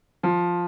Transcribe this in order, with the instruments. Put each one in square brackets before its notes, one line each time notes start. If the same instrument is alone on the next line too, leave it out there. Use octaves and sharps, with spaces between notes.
[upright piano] F3